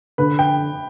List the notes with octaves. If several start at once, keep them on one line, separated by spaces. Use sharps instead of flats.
D3 B4
G5